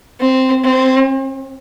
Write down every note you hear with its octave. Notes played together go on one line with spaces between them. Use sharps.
C4
C4